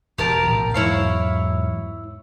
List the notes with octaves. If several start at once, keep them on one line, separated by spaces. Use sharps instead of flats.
E1 G4 A#4 A5
A#1 A2
E2 G#2 F#3 E4 C#5 F5